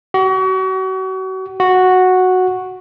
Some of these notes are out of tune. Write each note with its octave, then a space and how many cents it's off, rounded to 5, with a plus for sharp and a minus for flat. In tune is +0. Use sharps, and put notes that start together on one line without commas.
F#4 +35
F#4 -5